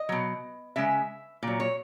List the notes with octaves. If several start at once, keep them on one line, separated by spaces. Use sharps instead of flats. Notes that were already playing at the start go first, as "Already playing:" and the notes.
Already playing: D#5
B2 F#3
C#3 G#3 E5
A#2 F#3
C#5